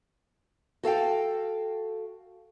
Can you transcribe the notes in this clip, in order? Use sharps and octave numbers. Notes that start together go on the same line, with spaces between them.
F#4 A4 F5 G5